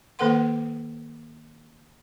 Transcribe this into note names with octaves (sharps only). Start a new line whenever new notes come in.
D#3 A#3 A4 B4 F#5 C6